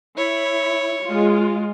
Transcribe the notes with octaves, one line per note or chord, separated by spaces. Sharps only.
E4 C#5
G#3 F4